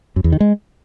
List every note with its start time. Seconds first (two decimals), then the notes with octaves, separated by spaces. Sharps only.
0.16 F#2
0.24 E2
0.32 D#3
0.40 G#3